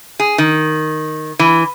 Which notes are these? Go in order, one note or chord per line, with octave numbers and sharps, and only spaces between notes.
G#4
D#3
E3